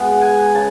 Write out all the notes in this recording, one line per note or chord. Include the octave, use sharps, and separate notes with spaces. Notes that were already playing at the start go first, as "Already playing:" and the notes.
Already playing: B2 G#3 B3 F#5
G#5
C#3 A5